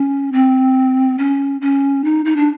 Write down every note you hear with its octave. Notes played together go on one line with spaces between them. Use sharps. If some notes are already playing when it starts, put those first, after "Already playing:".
Already playing: C#4
C4
C#4
C#4
D#4
D#4
D4